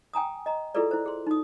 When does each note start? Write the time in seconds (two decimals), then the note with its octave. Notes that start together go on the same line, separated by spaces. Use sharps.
0.13 G5 G#5 A#5 D#6
0.46 D#5 A#5
0.75 E4 F4 G#4 A4 B4 D5
0.91 E4 C5
1.06 G#4 C6
1.27 D#4 D#6